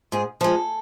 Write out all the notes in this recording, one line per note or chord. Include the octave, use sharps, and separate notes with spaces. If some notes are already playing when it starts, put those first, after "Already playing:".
G#2 G#4
F3 G#3 A4